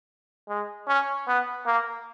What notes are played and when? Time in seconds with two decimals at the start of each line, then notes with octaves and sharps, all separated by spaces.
0.48 G#3
0.88 C#4
1.28 B3
1.66 A#3